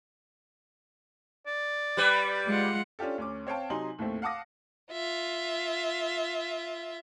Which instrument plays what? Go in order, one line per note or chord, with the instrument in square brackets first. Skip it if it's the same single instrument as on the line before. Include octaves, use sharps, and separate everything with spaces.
[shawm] D5
[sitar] G3 B4
[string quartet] G#3 F4 F#5
[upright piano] C#4 D4 F4 G4 A4
D2 C#4 D6
C4 C#5 F5 G5 A5
C3 F#3 D#4 G#5 C6 F#7
D#2 A2 A3 C4
F5 F#5 A5 D6 D#6 A#6
[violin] F4 E5